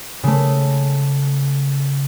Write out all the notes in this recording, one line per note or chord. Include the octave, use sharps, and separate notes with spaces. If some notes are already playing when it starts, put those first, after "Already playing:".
C#3 A3